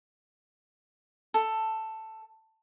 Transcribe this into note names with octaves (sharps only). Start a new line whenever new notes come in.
A4